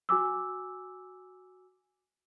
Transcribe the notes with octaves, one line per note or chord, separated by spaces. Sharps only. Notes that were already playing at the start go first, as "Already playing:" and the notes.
F#4 G#5 D6 E6